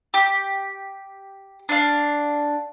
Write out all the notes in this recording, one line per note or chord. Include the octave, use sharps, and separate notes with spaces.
G4
D4 F5